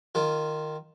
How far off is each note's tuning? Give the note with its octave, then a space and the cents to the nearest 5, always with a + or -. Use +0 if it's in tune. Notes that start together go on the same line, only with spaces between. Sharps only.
D#3 -15 F4 +0